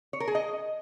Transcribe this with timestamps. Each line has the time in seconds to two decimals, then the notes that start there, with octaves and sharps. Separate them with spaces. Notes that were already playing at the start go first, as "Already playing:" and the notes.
0.13 C#5
0.20 A#4
0.28 G#4
0.35 D#5